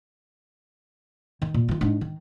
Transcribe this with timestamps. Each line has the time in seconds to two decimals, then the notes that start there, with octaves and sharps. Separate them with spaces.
1.42 D#3
1.54 A#2
1.69 D#3 F4
1.81 G#2 D4
2.01 D#3